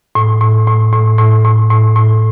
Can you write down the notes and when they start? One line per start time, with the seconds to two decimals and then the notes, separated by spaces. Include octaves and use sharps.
0.15 A2
0.41 A2
0.67 A2
0.93 A2
1.19 A2
1.45 A2
1.70 A2
1.96 A2